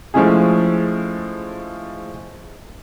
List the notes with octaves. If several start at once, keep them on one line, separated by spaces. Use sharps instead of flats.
F3 G#3 A3 C#4 E4 G#4